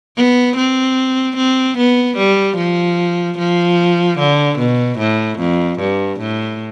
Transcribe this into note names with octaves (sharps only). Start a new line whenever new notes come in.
B3
C4
C4
B3
G3
F3
F3
D3
B2
A2
F2
G2
A2